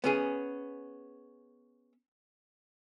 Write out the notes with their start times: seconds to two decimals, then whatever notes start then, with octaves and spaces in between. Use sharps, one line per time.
0.04 B3 C#4 G#4